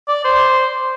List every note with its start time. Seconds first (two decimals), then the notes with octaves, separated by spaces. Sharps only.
0.08 D5
0.24 C5